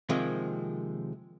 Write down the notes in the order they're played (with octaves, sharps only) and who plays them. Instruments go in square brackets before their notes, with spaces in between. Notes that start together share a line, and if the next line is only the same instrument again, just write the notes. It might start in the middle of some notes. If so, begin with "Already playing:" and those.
[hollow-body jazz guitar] C3 D#3 F3 G#3 A#3